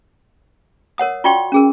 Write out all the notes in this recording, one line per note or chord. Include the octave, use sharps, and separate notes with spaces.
A#4 C#5 F#5 D#6
F4 F#4 D5 G5 C6 C#6
C#4 G#4 A#4